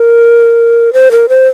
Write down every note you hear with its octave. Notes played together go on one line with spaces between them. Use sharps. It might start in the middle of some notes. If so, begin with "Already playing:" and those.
Already playing: A#4
C5
A#4
C5